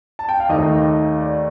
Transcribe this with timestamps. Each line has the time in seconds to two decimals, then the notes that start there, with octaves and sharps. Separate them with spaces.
0.19 A5
0.29 G5
0.40 F5
0.49 D#2 D#3 A3 D#5
1.20 D5